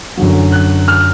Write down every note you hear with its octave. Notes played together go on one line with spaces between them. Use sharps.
F#2 D3 F#3
F#6
F6